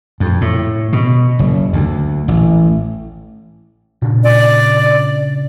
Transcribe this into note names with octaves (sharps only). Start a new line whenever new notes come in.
F2
A2
B2
F#1
D2
A1
A#2 C#3 D4
D5